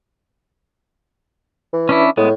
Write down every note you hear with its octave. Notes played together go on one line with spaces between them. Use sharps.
E3
C#4 D4 E4
A2 G#3 B3